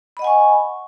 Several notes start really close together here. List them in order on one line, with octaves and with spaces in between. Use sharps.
B5 D#5 F#5 G#5 C#6